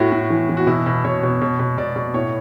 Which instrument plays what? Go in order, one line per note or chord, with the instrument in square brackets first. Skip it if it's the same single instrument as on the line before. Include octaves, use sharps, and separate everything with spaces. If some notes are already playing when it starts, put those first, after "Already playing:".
Already playing: [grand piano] A2 F#4
A2
E3
E3
F#4
B2 E4
B2
B2 C#5
B2
B2
B2
B2 D5
B2
A2 C#5